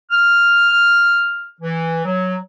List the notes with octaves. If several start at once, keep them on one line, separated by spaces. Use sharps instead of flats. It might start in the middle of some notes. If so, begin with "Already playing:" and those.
F6
E3
F#3